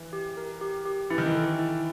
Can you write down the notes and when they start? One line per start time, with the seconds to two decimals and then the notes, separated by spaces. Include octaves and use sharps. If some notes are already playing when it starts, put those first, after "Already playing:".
Already playing: E3
0.13 G4
0.37 A#4
0.61 G4
0.86 G4
1.10 E3 E4
1.18 D#3
1.25 E3
1.35 A4
1.59 E4